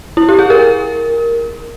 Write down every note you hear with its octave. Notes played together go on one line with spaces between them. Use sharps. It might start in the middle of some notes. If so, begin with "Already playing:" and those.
E4
G4
G#4
A#4